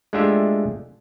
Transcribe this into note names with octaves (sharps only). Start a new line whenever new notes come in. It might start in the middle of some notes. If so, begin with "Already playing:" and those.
G#3 A3 D4 F4 G4 E5